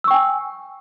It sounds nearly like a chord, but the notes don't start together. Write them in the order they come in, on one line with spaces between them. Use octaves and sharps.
E6 C#6 G5 G#5